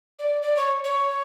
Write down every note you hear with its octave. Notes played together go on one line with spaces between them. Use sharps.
D5
D5
C#5
C#5